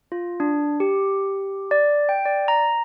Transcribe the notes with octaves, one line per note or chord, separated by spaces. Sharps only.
F4
D4
G4
D5
G5
D5
A#5